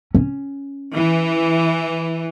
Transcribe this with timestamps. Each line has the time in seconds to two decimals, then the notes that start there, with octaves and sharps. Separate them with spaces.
0.15 C#4
0.95 E3